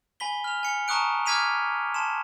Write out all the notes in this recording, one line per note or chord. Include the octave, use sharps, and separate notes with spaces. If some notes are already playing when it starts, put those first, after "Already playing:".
G#5 B5 B6 G7
F6 F7
G#5 C#7
A5 A#5 C#6 D#6 F#6 D7
D6 F6 G#6 B6 D#7 F7
A5 C6 E7